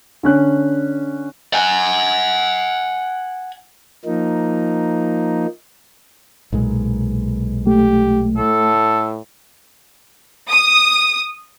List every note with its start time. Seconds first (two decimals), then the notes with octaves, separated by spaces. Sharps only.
0.23 D3 C#4 F#6
1.54 F#5 G#5
4.05 F3 A#3 D#4
6.53 B1 A#2 G#3
7.67 A3 G4
8.37 A2 A4
10.51 D#6